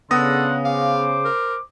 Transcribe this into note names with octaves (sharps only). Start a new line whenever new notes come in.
C#3 B3 D4 A4 F#5 C6 D#6 A#6
C5 F5 D6
A#4